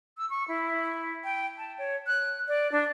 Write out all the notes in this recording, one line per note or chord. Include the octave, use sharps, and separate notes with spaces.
E6
C#6
E4
G5
A5
C#5
F#6
D5
D4